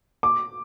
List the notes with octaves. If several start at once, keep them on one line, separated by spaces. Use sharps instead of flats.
D6